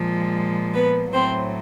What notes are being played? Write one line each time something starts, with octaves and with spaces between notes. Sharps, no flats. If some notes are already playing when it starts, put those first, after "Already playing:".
Already playing: A#2 F3 G#3
B3 B4
A2 F#3 C4 C5